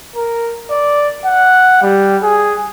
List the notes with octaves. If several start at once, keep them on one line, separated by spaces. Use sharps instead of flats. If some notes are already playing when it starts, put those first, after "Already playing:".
A#4
D5
F#5
G3
G#4